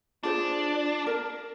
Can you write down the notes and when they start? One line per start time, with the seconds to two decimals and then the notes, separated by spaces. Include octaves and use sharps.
0.23 D4 F4 G#4 C5
1.07 A#4